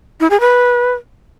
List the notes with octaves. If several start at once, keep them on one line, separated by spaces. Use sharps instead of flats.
E4
G#4
B4